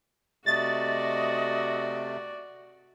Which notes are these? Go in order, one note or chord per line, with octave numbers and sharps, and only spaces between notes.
C3 A3 F#4 D5 D#5 A6